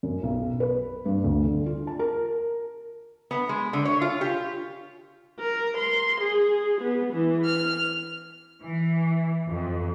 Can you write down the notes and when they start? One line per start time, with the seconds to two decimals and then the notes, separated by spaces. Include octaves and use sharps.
0.03 F#2
0.23 B1
0.60 B4
1.06 G2
1.24 D2
1.44 D3
1.66 F4
1.87 A5
1.99 A#4
3.31 B3
3.49 G#3
3.73 D3
3.85 C#5
4.01 F4
4.21 G4
5.39 A#4
5.77 C6
6.20 G#4
6.81 B3
7.13 E3
7.45 F6
8.63 E3
9.49 F2